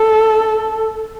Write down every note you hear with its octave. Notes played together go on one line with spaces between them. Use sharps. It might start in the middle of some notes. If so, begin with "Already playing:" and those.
Already playing: A4